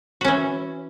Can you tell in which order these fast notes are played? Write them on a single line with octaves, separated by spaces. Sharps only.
F#4 C#4 E3